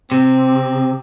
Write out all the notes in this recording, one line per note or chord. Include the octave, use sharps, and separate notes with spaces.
C3 C4